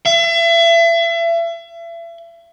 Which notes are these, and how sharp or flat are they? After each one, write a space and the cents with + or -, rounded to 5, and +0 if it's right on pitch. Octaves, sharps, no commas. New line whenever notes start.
E5 +35